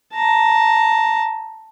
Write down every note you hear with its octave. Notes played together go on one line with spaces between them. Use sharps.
A5 A#5